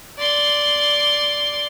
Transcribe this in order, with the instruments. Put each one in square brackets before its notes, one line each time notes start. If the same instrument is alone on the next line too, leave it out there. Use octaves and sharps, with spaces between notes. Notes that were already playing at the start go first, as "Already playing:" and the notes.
[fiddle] D5 C6